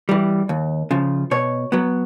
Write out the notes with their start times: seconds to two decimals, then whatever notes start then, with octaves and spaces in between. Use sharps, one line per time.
0.09 E3 G3
0.49 D#2
0.91 C#3 F3
1.31 B2 C#5
1.72 F#3 B3